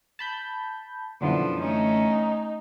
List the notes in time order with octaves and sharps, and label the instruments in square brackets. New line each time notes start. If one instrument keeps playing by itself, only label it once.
[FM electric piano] A5 B5 G6
[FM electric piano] F#2 D3 E3 [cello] B2 F3
[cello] A3 C#4 [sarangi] D#4